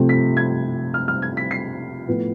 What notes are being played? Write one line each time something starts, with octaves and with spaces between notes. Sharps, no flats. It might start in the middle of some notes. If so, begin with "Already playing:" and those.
Already playing: C3 F3 A3 C4
B6
G#6
F6
F6
G#6
B6
C7
A2 F3 B3